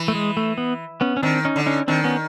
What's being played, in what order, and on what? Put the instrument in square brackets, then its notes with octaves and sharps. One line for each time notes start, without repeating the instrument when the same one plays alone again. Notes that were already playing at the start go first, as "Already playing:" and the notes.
Already playing: [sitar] E3
[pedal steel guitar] A3
G#3
A3
B3
B3 C#4
C#4
[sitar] D#3 [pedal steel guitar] C4 D4
[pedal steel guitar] C#4 D#4
[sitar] D3
[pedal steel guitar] C#4 D#4
[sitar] D#3 [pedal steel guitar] C4 D4
[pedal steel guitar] B3 C#4